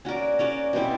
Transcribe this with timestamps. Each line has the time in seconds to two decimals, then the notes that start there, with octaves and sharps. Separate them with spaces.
0.05 C#4 F#4 A#4 D5
0.39 C#4 F#4 A#4 D5
0.73 B2 G3 C4 E4